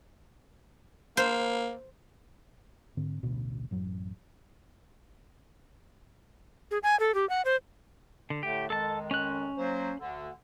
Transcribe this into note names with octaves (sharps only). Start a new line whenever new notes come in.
A#3 C5
G#2 D3 C4
A1 D2 B2
A1 F#2 F#3
G#4
G#5
A4
G4
F#5
C5
D3
A2 D3 A3 G4
F2 D#3 G#3 A4 A5
C#4 F#6
F#3 A#3 C5
D2 D3